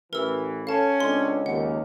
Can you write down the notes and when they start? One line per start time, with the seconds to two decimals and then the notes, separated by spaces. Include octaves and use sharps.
0.13 A1 E3 A#4 E6
0.67 C#4 A4 F5 A5
1.00 C#2 C4 D4 A4 C6
1.46 D#2 F#5